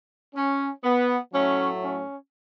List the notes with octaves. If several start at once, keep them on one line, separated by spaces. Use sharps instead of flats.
C#4
B3
A2 F#3 A3 C#4
C#4